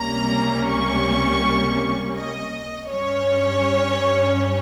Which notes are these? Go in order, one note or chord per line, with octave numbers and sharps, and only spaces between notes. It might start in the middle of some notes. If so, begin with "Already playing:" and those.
Already playing: C#2 C3 G3 A#3 C#4 A#5
C#6
D#5
G2 G3 C#4 C#5